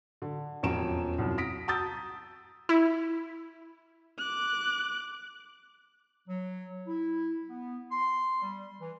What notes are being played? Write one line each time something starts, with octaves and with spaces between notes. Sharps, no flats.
D3
E1 F2 C#4 A#5 D7 E7
C2 F#2
D#6 A#6 B6 D7
A5 A#5 D#6 E6 G6 A6
E4
D6 F#6
F#3
E4
B3
C6
G3
E3